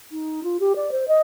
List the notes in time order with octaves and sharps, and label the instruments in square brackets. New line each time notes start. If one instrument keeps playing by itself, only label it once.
[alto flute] D#4
F4
G4
D5
C5
D#5